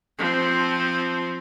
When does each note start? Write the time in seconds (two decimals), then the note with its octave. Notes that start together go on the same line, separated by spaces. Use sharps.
0.18 F3 C4